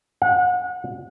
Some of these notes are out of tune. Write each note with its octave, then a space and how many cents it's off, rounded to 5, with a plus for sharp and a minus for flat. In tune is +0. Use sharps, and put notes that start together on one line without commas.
F#5 -35